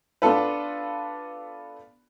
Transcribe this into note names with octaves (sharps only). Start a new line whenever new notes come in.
B3 D4 F4 A4 B4